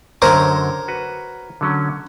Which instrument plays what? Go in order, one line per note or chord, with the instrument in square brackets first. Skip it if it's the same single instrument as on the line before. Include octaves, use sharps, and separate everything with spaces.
[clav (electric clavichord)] F#2 D3 F#3 [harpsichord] A#4 C5 C#5
[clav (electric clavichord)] F#4 B4
D3 F#3 C#4